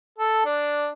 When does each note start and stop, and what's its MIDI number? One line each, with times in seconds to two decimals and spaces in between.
0.19 0.45 69
0.45 0.90 62